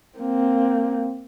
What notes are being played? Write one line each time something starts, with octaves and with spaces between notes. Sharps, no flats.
A#3 C4